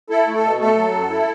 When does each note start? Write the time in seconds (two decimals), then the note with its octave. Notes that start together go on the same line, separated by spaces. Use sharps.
0.10 E4 A4
0.26 A3
0.35 A4
0.43 B2
0.60 A3 A4
0.77 F#3
0.93 F#2
1.10 E4